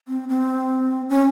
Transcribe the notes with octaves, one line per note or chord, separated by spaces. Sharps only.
C4
C4
C#4